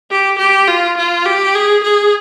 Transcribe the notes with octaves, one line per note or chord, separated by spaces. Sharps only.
G4
G4
F4
F4
G4
G#4
G#4